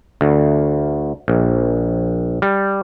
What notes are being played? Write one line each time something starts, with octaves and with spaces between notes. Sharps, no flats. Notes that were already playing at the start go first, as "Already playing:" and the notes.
D2
A#1
G3